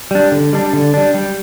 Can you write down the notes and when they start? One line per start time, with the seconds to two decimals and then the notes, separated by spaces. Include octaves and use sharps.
0.11 G3 D4
0.32 D3
0.53 G3 D4
0.73 D3
0.94 G3 D4
1.14 G3